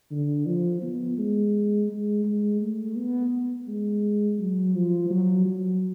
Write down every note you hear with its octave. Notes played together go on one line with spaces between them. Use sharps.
D3
F3
B3
G#3
G#3
G#3
A3
B3
G#3
F#3
F3
F#3
F#3